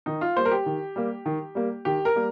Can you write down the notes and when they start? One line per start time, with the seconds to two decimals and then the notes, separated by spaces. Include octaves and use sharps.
0.06 D#3 D#4
0.21 F4
0.37 G3 A#3 C5
0.45 A#4
0.51 G4
0.66 D#3
0.96 G3 A#3
1.26 D#3
1.55 G3 A#3
1.85 D#3 G4
2.05 A#4
2.16 G3 A#3